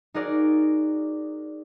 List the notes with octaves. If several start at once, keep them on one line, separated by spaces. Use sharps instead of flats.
D#4 F#4 G#4 A#4 D5